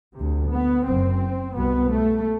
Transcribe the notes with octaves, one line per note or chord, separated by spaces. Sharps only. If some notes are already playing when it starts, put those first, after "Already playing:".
D2 C3
B3
F#1 F#2 C4
C2 B2 B3
A3